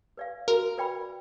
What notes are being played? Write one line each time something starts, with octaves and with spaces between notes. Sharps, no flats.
B4 D5 F5
F#4 A#4
B4 D5 G5 B5